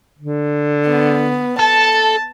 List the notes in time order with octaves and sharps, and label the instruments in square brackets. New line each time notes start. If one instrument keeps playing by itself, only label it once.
[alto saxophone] D3
[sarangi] B3
[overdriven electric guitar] A4 [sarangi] A5